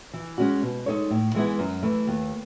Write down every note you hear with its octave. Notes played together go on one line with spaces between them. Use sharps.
E3
G#3 C#4 F#4
B2
G#3 D#4 A4 C#5
A2
E3 G#3 B3 E4
F#2
E3 A3
D#2